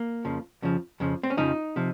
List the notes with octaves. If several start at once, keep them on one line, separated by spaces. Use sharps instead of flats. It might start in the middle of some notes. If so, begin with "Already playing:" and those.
Already playing: A#3
F2 C#3 F3
F2 C#3 F3
F2 C#3 F3
C4
C#4
F2 C#3 F3 D#4
C3 F3